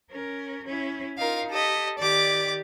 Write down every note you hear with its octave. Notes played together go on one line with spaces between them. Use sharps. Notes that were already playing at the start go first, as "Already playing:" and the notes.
C#4 A#4
C#4 E4
D#4 F4 A#4 F5
G4 A4 D#5
D#3 G4 D5 D6